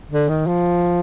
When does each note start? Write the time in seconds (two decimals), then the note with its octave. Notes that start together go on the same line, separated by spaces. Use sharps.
0.11 D3
0.29 D#3
0.47 F3